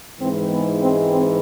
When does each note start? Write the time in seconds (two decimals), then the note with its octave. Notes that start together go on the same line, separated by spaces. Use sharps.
0.20 G#2 E3 G#3 C4
0.50 B3
0.81 C4
1.11 C4